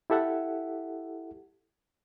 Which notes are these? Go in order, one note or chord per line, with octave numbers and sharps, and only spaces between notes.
E4 G4 A4 E5 F#5